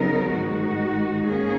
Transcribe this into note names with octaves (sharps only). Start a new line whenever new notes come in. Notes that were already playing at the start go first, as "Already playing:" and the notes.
Already playing: C#3 F#3 B3 D#4 A#4
G#2 D#3 G#3 D#4 F#4
G#2 D#3 A#3 C#4 G#4